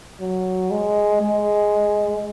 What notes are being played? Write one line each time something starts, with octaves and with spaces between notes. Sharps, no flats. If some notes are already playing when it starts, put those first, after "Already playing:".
F#3
G#3
G#3